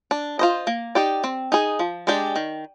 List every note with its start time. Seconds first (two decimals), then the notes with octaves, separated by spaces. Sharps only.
0.11 D4
0.39 F4 C5 D#5
0.67 A#3
0.95 D#4 G4 D5
1.24 C4
1.52 D#4 G#4
1.79 F3
2.07 G#3 D4 G4 D5
2.36 D#3